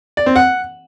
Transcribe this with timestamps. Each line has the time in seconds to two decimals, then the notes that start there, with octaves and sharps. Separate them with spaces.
0.17 D5
0.26 C4
0.36 F#5